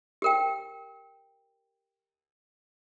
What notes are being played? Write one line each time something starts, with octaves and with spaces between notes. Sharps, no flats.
G4 A#4 G5